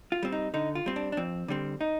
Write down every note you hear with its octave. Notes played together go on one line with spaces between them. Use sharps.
F4
G3 C4
D#4
D3 D#4
F4
G3 C4
D4
D4
F2 C4
D3 G3 C4
D#4